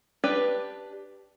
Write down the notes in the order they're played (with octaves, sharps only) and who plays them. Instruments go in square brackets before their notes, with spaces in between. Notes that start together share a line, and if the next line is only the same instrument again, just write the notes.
[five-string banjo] D4 G4 B4